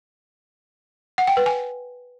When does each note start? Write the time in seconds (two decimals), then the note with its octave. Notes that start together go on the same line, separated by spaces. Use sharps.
1.18 F#5
1.27 G5
1.37 B4
1.46 G#5